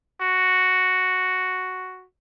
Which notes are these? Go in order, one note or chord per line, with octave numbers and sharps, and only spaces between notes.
F#4